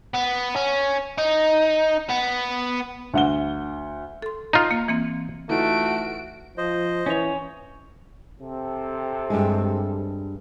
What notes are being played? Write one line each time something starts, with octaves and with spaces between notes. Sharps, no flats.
B3
C#4
D#4
B3
D2 F#5 G7
A4 C6
D#4 F4
A#3
E3 A#3 C4
E3 A3 D#4 F4 F#4 D7
F3 C5 D#5
E3 C#4 C#5
C3 C4 A4
G2 G#3